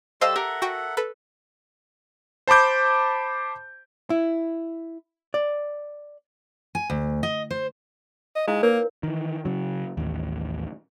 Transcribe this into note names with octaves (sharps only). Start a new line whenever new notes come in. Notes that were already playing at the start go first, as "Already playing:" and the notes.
G3 G4 A4 C5 D#5 F5 C6 E6
G4 A4 A#4 E5 F#5
F#4 G5 C#6
A4 B4
C5 A5 B5 D6 G6
E4
D5
G#5
D2
D#5
C5
D#5
G#3 D#4 E4 F5
A#3 A#4 B4 C#5
D#3 E3
C#3 F#3
A1 D#2